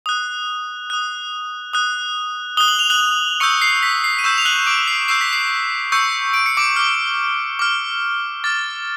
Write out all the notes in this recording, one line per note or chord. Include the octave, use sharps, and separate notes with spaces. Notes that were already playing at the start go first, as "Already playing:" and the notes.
D#6 F#6
D#6 F#6
D#6 F#6
D#6 F#6 G7
F#7
F7
F#6 F#7
C#6 E6 G6 C#7
C7
B6
C7
D#7
C#6 E6 G6 E7
F7
F#6 F#7
D6 D7
C7
C#6 E6 G6 C7
B6
C7
C#6 E6 G6 C#7
D7
C#7
D6 D7
D6 F6
D6 F6
D6 F6 A6